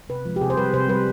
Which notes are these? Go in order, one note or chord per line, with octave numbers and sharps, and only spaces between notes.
C3 B4
F3 G#3
G4
C3 G#4
C5
G3 B4
C3 C5
G3 B4